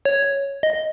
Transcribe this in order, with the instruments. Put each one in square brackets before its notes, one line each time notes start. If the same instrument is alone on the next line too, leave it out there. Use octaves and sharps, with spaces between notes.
[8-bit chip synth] C#5
D#5